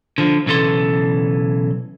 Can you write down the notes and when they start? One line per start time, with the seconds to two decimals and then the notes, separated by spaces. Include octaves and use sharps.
0.18 D3 F3
0.46 B1 C#3 E3 A4 C6